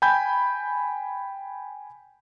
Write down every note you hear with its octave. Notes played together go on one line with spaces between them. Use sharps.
G5 G#5 B5 G6